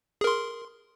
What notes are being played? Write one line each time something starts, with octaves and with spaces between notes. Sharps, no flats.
G#4 A#4 C6